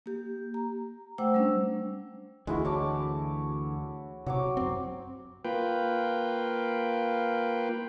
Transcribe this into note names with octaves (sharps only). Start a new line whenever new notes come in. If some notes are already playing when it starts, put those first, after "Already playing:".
A#3 G4
A#5
A3 C5 F#5 G5 D6 E6
G3 C#4 D4
D2 E3 G#3 E4 F#4
C#5 A5 D6
C3 F#3 C#5 D6
F#2 C4
A#3 F4 B4 G5